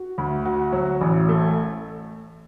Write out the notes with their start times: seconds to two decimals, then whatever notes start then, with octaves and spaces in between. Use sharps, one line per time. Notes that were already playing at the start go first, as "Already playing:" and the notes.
Already playing: F#4
0.18 D2
0.45 F#4
0.72 F#3
1.01 A1
1.29 A3